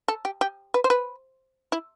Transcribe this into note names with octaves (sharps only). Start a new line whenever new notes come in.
A4
G4
G4
B4
C5
B4
E4